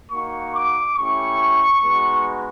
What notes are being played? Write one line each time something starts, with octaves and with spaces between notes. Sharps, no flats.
A#3 D#4 F#4 C#6
D6
A3 C#4 E4 G4 C#6
G#3 B3 D#4 F#4